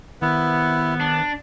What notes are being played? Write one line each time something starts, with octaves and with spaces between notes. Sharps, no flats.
C3 D#3 B3 E4
D4